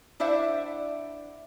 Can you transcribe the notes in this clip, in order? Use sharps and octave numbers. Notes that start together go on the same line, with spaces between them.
D4 E4 C5 D5 E5 F#5